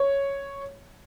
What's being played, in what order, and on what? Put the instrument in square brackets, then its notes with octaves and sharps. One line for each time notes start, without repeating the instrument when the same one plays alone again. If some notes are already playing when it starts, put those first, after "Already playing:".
Already playing: [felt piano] C#5